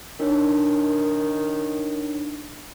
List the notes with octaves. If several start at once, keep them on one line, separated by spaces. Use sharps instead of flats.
D#3 D4 D#4 C#5